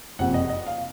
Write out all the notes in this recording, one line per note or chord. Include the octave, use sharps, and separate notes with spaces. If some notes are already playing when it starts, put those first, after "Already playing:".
F#1 F2 C3 F3 A#3 F#5
D#5
D#5
F5